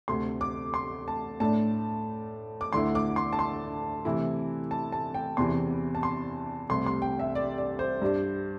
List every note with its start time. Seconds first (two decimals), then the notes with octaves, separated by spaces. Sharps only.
0.08 D2 C3 A3 C6
0.41 D6
0.74 C6
1.08 A5
1.40 A2 A3 D4 A5
2.61 D6
2.73 D2 D3 A3 E4 C6
2.95 D6
3.16 C6
3.33 A5
3.39 C6
4.05 C3 E3 A3 E4
4.71 A5
4.92 A5
5.14 G5
5.37 E2 C3 E3 C6
5.95 A5
6.03 C6
6.69 C2 C3 A3 C6
6.86 C6
7.02 G5
7.19 E5
7.35 D5
7.58 D5
7.79 C5
8.02 G2 G3 D4